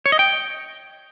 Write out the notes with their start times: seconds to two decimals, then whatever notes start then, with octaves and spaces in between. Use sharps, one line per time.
0.06 C#5
0.12 D#5
0.19 G5